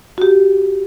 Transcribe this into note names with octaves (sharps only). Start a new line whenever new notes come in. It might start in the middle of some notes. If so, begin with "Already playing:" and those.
F#4 G4